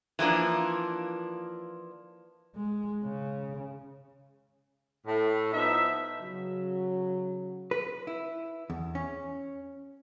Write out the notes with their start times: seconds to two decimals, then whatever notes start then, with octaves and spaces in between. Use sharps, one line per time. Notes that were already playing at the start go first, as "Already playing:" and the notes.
0.19 E3 F3 A#3 D4
2.56 G#3
3.05 C#3
5.06 A2
5.53 F3 B3 D#4 E5
6.21 C#3 F#3
7.71 B4
8.07 E4
8.70 E2
8.95 C#4